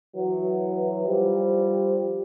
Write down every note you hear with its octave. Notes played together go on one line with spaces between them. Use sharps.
E3 F#3
F3 G3